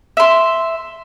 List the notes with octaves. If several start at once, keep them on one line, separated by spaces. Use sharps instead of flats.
E5 C6